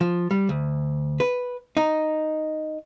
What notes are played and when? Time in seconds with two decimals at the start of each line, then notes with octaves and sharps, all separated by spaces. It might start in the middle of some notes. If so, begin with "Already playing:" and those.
0.01 F3
0.31 G3
0.49 D2
1.20 B4
1.77 D#4